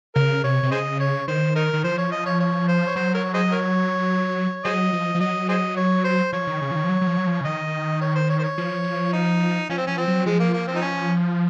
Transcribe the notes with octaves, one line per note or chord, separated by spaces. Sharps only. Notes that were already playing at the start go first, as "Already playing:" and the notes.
C#3 A#4
C3 C#5
C3
C#3 G#4 C5 D#5
C#5
D#3 C5
D#4 A#4
D#3
F3 C5
C#5
D#5
C#5
C#5
C5
C#5
F#3 C5
A#4 C#5
G#4 C5 D#5
A#4 C#5
F#3 G#4 C5 D#5
F3
F3
F#3 D#5
G#4 C5 D#5
C#5
C5
F3 C#5
D#3
C#3
F3
D#3
F3
F#3
F#3
F3
F#3
F3
C#3
D#3 D#5
C#5
C5
C#5
C5
C#5
F3
D#4
F3 C#4
C4
F3 C#4
C4
F#3
F3 G#3
A#3
A#3
C4
D#4
C#4